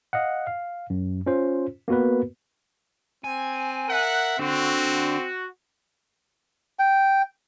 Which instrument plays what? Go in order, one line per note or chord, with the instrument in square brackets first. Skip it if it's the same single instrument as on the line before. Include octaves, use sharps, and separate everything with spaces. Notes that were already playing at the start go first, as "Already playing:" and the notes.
[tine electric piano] D#5 F5 F#5
F5
F#2
C#4 F4 C5
A#3 B3 F#4 A#4 B4
[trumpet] C4 [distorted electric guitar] G#5
[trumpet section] A#4 E5 F#5
[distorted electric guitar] D3 [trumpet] C4 [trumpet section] F#4
[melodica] G5